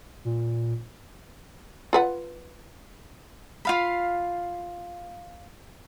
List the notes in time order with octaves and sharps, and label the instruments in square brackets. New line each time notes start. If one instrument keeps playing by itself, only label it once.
[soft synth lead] A#2
[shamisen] F4 B4 F#5
[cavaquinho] F4 F5 B5